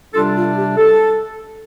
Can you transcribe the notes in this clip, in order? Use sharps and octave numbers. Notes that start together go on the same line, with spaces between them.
C3 G3 D4 F4 A4
F4
G4
A4